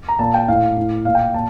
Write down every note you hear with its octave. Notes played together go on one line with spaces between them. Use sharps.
A#5
A#2 A5
G5
A2 F5
A2
A#2 F5
G5
A#2 A5